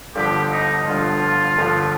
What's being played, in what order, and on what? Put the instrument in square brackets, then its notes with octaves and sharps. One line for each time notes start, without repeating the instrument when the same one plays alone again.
[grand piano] G1 G2 D3 F3 [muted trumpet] G4
[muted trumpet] D#4
[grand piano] G1 G2 D3 F3 [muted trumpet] F4
[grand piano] G1 G2 D3 F3